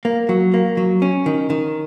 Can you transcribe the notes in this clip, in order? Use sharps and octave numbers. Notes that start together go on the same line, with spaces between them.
A#3
F#3
A#3
F#3
C#4
D#3
D#3